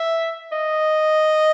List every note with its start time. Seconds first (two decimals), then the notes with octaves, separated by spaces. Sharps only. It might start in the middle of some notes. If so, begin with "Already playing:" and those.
Already playing: E5
0.52 D#5